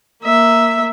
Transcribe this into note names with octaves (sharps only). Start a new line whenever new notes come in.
A#3 E5